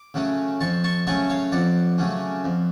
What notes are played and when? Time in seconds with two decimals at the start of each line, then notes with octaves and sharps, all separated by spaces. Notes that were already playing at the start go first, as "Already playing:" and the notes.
Already playing: D6
0.14 C#3 F#3 A3 C#4
0.60 F2 A5 C#6
0.84 A5 C#6
1.07 C#3 F#3 A3 C#4 A5 C#6
1.30 C#5 F5
1.52 F2 D5 F#5
1.98 C#3 F#3 A3 C#4
2.44 F2